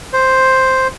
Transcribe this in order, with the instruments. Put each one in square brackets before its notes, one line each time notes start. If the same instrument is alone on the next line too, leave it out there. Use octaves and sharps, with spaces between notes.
[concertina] C5